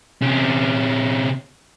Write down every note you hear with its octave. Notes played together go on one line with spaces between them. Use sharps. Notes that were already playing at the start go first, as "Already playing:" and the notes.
C3 C#4